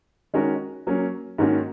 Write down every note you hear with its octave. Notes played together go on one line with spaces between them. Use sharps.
D#3 G#3 C#4 F#4 A#4
F#3 A#3 C#4
G#2 D#3 A#3 C#4 F#4